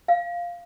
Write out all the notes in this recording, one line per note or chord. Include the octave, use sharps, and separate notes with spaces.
F5